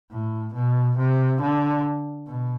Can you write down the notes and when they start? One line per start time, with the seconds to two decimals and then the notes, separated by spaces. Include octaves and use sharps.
0.11 A2
0.54 B2
0.98 C3
1.41 D3
2.27 B2